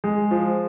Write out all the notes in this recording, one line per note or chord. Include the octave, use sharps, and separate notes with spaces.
G#3
F3